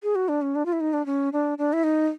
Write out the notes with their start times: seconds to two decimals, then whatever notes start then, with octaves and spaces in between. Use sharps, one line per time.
0.03 G#4
0.15 F#4
0.29 D4
0.42 C#4
0.55 D4
0.66 F4
0.73 E4
0.81 D#4
0.93 D4
1.06 C#4
1.33 D4
1.58 D4
1.73 E4
1.84 D#4